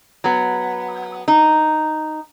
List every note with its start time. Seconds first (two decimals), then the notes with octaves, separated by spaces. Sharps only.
0.24 F#3 B3
1.28 D#4